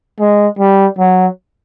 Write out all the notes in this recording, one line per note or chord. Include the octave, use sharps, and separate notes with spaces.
G#3
G3
F#3